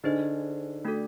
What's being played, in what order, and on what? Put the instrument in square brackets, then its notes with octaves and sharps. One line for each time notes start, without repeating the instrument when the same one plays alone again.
[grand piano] D3 [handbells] D#4 G#4 C5 D#5
[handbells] A3 D4 F#4 A4